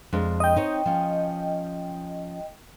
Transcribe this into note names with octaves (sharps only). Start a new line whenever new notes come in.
F2 G#3 D4
D#5 G5
C4 D#4 C#5
F3 C#4